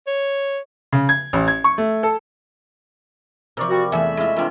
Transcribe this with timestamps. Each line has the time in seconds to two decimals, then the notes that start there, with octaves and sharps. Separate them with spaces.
0.07 C#5
0.93 C#3
1.09 G#6
1.33 A1
1.48 G#6
1.64 C#6
1.78 A3
2.03 A4
3.57 C3 F3 A#4 D5 C#6
3.69 G3 A#3 F#4
3.92 E2 A3 G#4 E5 B5
4.17 G#3 E4 F4 D#5
4.36 C4 D4 E4 F4 A#4